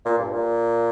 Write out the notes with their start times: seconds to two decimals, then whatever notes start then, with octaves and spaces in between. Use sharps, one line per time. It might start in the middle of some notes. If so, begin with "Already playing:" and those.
0.06 A#2
0.19 G2
0.32 A#2